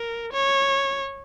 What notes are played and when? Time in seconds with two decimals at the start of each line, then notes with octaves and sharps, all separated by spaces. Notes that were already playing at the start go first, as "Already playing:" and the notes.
Already playing: A#4
0.33 C#5